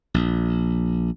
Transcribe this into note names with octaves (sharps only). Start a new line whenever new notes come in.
A#1